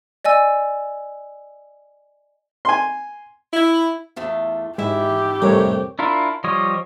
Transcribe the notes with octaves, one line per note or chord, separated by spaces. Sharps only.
D5 D#5 G#5 E6
G#5 C6
E4
E2 A3 F4
G#2 G#3 E4 G4 E5
C2 F2 A2 G3 A#4 C#5
D4 E4 F4 A#4
F3 G3 G4 C#5 D#5